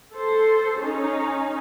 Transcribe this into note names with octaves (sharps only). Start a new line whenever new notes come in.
A4 C5
C#4 D#4